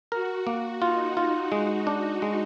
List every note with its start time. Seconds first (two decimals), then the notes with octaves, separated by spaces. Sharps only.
0.12 F#4 A#4
0.47 A#3 F#4
0.82 D#4 F4
1.17 F4
1.52 G#3
1.87 D4
2.22 G#3